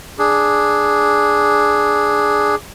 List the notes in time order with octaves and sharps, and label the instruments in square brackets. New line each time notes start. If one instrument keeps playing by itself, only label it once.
[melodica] D4 G#4